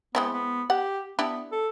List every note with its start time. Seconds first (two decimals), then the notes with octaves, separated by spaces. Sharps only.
0.15 G#3 B3 C4 E4
0.33 B3
0.70 G4 F#5
1.19 B3 D4 E4 G4
1.52 A4